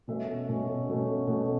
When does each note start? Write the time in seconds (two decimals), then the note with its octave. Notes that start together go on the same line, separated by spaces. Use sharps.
0.08 B2 A3 C#4 E5
0.49 B2 A3 C#4
0.89 B2 A3 C#4
1.27 B2 A3 C#4